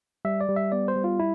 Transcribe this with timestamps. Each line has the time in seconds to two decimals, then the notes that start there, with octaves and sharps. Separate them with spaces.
0.25 G3 E5
0.41 D5
0.49 G3
0.56 E5
0.72 B3 D5
0.88 C5
0.96 G3
1.04 F4
1.20 E4